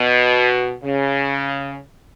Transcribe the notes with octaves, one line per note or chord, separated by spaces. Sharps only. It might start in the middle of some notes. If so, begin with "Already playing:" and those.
Already playing: B2
C#3